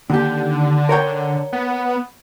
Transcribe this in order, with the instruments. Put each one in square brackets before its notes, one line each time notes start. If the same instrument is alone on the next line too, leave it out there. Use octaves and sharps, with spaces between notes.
[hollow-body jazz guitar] D#2 G4 [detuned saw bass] D3
[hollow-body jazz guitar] A#4 C#5 G5
[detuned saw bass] B3